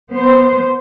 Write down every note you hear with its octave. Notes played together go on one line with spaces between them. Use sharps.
B3 C5